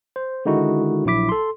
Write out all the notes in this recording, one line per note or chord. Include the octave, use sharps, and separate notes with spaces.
C5
D3 D#3 G#3 D#4 E4 F#4
A#1 F#3 E4 D6 B6
A4 C6